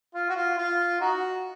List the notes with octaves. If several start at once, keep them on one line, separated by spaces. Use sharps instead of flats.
F4
F#4
F4
F4
D#4 F#4